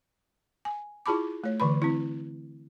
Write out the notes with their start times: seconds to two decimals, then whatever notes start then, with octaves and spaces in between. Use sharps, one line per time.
0.65 G#5
1.06 E4 F4 G#4 A5 B5 D6
1.44 A3 C#5
1.60 D3 E3 B4 B5
1.82 C4 E4